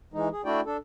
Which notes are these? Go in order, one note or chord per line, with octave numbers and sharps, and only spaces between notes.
E3 G#3 D#4
G#4
A3 D4 E4 F#4 D5 G5
D4 A4